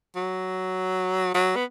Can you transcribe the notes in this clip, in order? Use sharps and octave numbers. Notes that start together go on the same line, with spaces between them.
F#3
F#3
B3